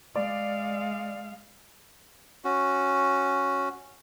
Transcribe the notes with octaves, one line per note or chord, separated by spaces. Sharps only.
G#3 D5 F5
C#4 F#4